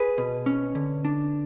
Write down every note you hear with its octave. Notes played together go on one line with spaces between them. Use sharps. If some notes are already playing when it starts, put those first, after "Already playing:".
Already playing: G#4 B4
B2
C#4
D3
D4